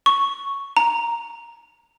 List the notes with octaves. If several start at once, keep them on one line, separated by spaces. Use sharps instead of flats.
C#6
A#5